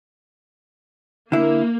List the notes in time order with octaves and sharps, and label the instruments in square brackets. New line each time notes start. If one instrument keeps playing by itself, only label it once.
[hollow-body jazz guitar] D3 E4 [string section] A#3